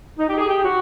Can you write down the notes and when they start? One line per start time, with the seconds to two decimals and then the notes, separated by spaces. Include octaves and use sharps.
0.18 D#4
0.29 G4
0.38 G#4
0.48 G4
0.63 F#4